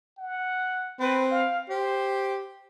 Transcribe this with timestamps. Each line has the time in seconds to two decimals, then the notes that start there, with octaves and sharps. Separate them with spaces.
0.18 F#5
1.00 C4 B4
1.31 F5
1.70 G4 C5